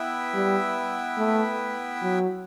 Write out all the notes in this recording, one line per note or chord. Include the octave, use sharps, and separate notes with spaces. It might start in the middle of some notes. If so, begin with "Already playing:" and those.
Already playing: B3 E4 B4 E5 G5
G3
A3
F#3